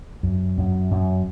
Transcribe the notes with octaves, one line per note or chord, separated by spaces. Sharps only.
F#2
F#2
F#2